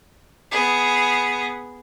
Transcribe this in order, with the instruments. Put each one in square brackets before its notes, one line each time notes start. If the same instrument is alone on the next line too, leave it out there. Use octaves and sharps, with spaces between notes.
[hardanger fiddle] B3 G#4